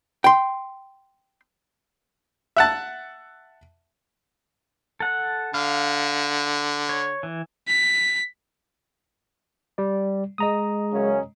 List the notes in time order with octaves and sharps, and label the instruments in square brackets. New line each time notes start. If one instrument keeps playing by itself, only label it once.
[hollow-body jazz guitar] G5 C6
[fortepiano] E5 F#5 A5
[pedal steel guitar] A4 F#5
[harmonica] D3 [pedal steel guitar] F5
[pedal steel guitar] C#5
E3
[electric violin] B6
[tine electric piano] G3 D5
[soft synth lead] G#3 [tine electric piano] D#5 A#5 D#6
[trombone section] F#2 C#3 C#4